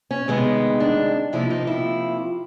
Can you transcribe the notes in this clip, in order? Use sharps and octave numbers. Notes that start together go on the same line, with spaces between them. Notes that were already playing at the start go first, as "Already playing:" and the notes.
C#4
D2 C3 D#3 G#3 B3
D4
C3 F3 A#3 E4
D#4
E4